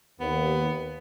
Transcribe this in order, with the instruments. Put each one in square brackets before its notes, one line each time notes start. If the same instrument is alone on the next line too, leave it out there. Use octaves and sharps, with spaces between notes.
[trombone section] D#2 [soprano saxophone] B3